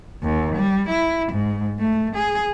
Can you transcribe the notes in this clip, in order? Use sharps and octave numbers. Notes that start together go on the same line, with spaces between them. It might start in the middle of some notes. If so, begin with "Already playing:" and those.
D#2
G3
E4
G#2
A3
G#4